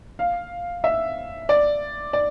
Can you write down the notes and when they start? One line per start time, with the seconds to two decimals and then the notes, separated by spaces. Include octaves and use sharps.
0.19 F5
0.84 E5
1.49 D5
2.13 D5